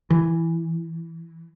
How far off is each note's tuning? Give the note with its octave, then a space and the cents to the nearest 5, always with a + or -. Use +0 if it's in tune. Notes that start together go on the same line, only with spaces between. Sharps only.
E3 +5